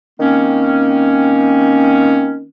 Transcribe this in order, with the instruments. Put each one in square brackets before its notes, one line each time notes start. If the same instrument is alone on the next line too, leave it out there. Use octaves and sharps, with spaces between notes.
[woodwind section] D#3 A#3 C4 C#4